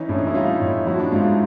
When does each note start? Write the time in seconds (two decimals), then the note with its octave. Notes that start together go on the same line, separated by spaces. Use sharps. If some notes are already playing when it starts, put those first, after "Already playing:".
Already playing: E3 C#4 D#4
0.09 A2 D4
0.18 D#4
0.27 E4
0.34 G3 D#4 F4
0.61 A2
0.86 F3 E4 F#4
1.00 D4 E4
1.12 G#2 D#4 F4